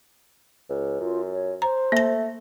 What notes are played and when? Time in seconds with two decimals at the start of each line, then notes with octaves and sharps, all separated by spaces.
0.70 C#2
1.00 F#2 F4
1.32 C#5
1.62 C5 A#5
1.92 A3 A#3 A#6